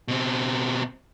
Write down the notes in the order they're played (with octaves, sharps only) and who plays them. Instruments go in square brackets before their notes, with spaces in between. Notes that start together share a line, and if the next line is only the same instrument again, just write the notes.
[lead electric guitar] B2 C4